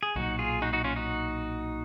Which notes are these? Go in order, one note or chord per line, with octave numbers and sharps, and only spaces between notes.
G#4
B1 A#2 F#3 D#4 F#4
F4 G#4
D#4 F#4
D#4 F#4
C#4 F4
D#4 F#4